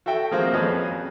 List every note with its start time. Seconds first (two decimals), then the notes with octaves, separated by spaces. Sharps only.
0.06 F#4 A4 E5 G5
0.31 F3 G#3 A#3 C4 F#4
0.53 F2 F3 C#4 G#4 B4 D#5